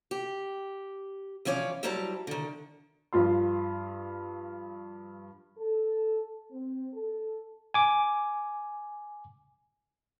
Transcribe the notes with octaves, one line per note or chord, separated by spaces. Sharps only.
G4
E3 F3 C#4 C#5 D5
F#3 G3 E4 C5 A5 A#5
D3 D#3
G2 F3 F4 C6
A4
C4
A4
G#5 D6